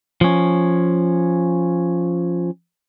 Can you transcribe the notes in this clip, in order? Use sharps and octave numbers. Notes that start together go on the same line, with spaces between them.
F3 C#4